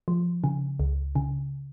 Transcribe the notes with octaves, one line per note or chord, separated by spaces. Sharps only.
F3
C#3
C#2
C#3